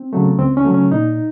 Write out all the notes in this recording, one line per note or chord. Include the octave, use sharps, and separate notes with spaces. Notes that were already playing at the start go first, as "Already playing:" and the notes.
Already playing: C4
C#3 F#3 A3
C#2 C4
C#4
C#3 F#3 A3
C#4
A#2 D#4